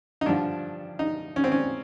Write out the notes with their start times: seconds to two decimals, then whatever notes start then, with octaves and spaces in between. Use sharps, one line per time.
0.21 D#4
0.26 G2 D3 F3 D4
0.99 D#4
1.36 C#4
1.44 C4
1.52 C#4